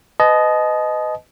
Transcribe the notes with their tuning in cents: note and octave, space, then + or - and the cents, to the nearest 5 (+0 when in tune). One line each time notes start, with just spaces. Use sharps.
B4 +25 D#5 +0 A5 -40